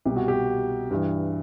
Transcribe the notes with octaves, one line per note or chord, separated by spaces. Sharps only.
C2 B2 G4
F#4
G4
G2 E3